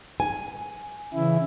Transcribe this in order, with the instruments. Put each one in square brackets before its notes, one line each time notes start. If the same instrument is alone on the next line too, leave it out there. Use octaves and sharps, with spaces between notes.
[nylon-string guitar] G#5
[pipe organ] C#3 E3 E4